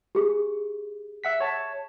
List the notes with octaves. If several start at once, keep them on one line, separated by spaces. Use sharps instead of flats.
G4 G#4
E5 F#5 B6
C#5 A5